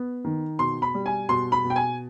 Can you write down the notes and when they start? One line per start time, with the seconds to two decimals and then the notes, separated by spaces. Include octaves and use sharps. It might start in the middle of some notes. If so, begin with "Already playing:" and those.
Already playing: B3
0.25 D#3
0.59 B2 C6
0.82 B5
0.94 G3
1.06 G#5
1.29 B2 C6
1.52 B5
1.65 B2
1.70 G5
1.76 G#5